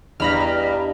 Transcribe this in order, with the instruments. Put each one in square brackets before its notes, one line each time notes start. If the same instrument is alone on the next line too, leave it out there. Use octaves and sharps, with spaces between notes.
[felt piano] E2 F5 [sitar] G2 [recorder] D#5 [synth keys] A#5 B5 F6